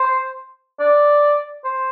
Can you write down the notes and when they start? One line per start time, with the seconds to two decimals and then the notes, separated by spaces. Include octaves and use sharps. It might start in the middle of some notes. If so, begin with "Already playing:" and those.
Already playing: C5
0.80 D5
1.64 C5